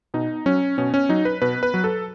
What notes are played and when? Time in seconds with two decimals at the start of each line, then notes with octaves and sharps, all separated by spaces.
0.14 B2 D#4
0.46 F#3 C#4
0.78 B2 C#4
0.94 C#4
1.09 F#3 D#4
1.25 B4
1.42 B2 B4
1.63 B4
1.74 F#3
1.84 A4